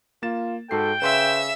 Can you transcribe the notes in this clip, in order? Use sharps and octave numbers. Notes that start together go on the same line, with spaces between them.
A#3 F4 A6 E7
G#2 F#4 A4 G5 C7
C#3 B4 E5 C6 E6 E7